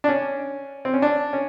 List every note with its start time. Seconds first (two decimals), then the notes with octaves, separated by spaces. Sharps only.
0.04 D4
0.09 C#4
0.85 C4
0.94 C#4
1.02 D4
1.33 C#4